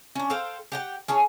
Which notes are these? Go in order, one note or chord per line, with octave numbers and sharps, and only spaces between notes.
C#4 D4
A4 C5 F5 G5
G4 F#5 G5
C#4 G#4 A4 C#5